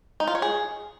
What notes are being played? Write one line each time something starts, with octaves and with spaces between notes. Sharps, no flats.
D#4
F4
C#5
G#4